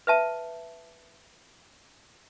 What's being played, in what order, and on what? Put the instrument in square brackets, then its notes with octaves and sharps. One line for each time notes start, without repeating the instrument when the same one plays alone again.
[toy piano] B4 E5 A5